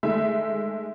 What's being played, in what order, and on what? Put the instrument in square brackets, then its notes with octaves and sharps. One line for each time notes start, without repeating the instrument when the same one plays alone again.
[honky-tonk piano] D#3 G#3 A3 E5